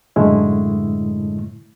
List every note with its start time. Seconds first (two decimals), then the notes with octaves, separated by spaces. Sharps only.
0.16 F#2 A2 D3 G#3 A3 E4